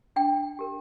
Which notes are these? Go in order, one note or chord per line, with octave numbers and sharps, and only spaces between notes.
D4 G5
G4 A#4